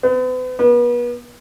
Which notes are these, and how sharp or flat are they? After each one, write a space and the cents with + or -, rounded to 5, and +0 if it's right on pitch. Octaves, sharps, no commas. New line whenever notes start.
B3 +45
B3 -35